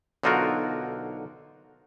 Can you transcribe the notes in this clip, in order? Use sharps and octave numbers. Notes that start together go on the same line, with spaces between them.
B1 D3 D#4 F4 F#4 A#4